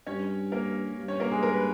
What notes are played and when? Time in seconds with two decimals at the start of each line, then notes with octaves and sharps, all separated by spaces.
0.07 G2 C#4 C#5
0.52 A#3 A#4
0.97 G2
1.08 C#4 C#5
1.20 A#3 A#4
1.32 G#3 G#4
1.43 A#4
1.53 B4